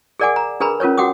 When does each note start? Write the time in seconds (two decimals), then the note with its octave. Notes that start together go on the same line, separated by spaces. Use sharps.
0.20 G#4 A#4 D5 F#5 G#5 D6
0.36 A#5
0.60 D4 G#4 A#4 B4 A#5 B5
0.80 C#4 F4 A#4 B4 C#5
0.98 F#4 F#5 G5 D6 D#6